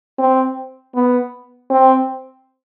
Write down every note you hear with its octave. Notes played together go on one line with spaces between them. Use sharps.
C4
B3
C4